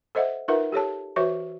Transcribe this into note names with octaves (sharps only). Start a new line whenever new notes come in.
A4 C5 D#5 E5 F#5
D#4 F4 A#4 B4 E5 F#5
G4 A4 C#5 A5
E3 F#4 B4 C#5 E5 C#6